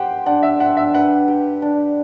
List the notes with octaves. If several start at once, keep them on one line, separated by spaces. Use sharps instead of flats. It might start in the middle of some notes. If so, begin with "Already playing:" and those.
Already playing: G4 C5 F#5 G5
D4 F#5
E5
D4 F#5
E5
B4 F#5
G4
D4